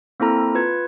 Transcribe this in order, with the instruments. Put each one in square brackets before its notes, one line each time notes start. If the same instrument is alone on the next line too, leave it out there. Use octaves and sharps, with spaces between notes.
[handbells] A#3 C4 E4 A4 A#5
F4 B4 G#6